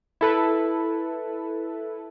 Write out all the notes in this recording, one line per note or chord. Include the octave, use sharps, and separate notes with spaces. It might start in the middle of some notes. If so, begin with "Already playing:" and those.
E4 A4 B4